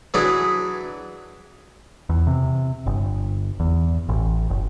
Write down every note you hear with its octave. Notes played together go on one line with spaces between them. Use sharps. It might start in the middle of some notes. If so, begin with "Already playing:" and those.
E3 F#3 D4 E4 G#4
E2
C3
G1
E2
A1
F#1